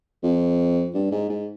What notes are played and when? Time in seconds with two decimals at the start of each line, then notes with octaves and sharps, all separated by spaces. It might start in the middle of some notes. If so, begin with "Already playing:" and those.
0.23 F2
0.95 G2
1.11 G#2
1.30 G#2